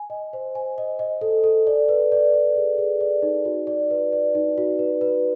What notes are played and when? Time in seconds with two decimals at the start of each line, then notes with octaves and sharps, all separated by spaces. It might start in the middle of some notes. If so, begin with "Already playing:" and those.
Already playing: G#5
0.10 D#5
0.33 C5
0.55 G#5
0.78 D#5
0.99 D#5
1.21 A4
1.44 A4
1.67 D5
1.89 B4
2.12 D5
2.34 D5
2.56 G#4
2.78 G#4
3.01 D5
3.23 D#4
3.45 F#4
3.67 D5
3.91 B4
4.12 D5
4.35 D#4
4.58 F#4
4.79 B4
5.01 B4